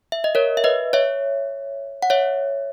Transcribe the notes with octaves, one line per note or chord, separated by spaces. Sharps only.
E5
D#5
A#4 C#5
E5
B4 D#5
C#5 E5
F#5
C#5 E5